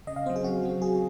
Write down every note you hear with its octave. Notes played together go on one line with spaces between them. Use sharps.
C#3 D#5
F5
F#3 C4 C5
G#4
C#3 F#4
F#3 C4
C#3 G#4